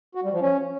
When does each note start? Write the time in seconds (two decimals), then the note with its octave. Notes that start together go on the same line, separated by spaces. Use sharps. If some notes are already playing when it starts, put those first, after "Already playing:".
0.15 F#4
0.24 G3
0.32 F3
0.41 C#4